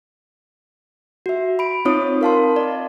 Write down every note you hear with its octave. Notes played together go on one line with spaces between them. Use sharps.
F#4 E5
B5 D7
C4 D#4 F4 C#5 D#6
A#4 F5 A5 C6
D5 D#5